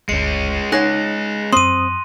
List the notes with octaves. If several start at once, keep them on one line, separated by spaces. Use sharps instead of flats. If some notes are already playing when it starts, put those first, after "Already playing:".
G1 D2 G#3 C#4 C#7
D#4 G#4 C#5 F#5 F#6 A#6
F#2 C4 C6 D#6 D#7